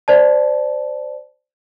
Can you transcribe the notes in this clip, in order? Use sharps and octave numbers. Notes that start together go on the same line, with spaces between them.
C5 D5 A5